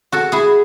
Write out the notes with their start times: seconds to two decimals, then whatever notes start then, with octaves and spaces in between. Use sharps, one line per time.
0.12 F#4 A4
0.32 E4 G#4